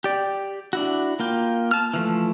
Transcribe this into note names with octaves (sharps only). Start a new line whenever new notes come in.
G4 D5
D4 E4 F#4
A#3 F4 G5
A5 F6
E3 F3 A3